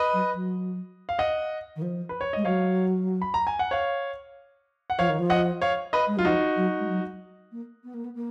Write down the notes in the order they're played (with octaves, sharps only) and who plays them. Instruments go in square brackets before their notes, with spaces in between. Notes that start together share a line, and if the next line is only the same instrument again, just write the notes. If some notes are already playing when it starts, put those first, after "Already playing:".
Already playing: [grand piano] B4 D#5
[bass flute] F#3
F#3
[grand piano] F5
D#5 F#5
[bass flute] D#3
F3
[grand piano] B4
C#5
[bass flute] G#3 [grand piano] D#5
[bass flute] F#3 [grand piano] C#5 F5
[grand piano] B5
A#5
G#5
F#5
C#5 F5
F#5
[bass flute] F3 [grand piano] C#5 F5
[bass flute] D#3
F3
[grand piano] D#5 F#5
C#5 F5
B4 D#5
[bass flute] G#3
[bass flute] F#3 [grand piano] F4
[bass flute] F3 [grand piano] D#4 F#4
[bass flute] F#3
G#3
F#3
A#3
B3
A#3
B3
A#3